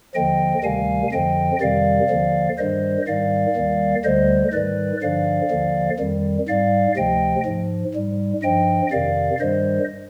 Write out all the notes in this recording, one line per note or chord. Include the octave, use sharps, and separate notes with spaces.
D#2 D3 F3 D#5 G5
D2 C3 D#3 G3 F5 G#5
F2 D3 F3 D#5 G5
F2 C3 D#3 G3 D5 F5
D#2 D3 F3
G2 D#3 G3 C5 D#5
G#2 D#3 G3 D5 F5
D#2 D#3 G3
D2 D3 G3 C5 D#5
G#2 D#3 G3 B4 D5
G2 D3 F3 D5 F5
D#2 D3 F3
F2 D#3 G3
G#2 G3 D5 F5
D2 C3 F3 D#5 G5
G#2 F3
G#2 G3
G2 F3 D#5 G5
F2 C3 D#3 D5 F5
G2 D#3 G3 C5 D#5